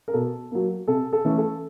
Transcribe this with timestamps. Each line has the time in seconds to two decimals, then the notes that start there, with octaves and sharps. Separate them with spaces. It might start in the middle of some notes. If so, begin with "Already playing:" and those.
0.08 A#4
0.13 B2 A4
0.51 F#3 A#3
0.88 C3 A4
1.13 A4
1.25 E3 A3 C#4
1.38 A4